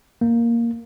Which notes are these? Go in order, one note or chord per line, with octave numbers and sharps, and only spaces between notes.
A#3